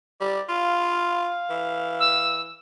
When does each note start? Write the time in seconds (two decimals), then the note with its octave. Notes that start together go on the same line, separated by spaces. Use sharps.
0.21 G3 D5
0.49 F4 F5
1.50 E3
2.00 E6